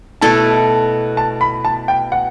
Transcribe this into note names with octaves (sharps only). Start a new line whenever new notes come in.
B2 A3 E4 A4 A5
A5
B5
A5
G5
F#5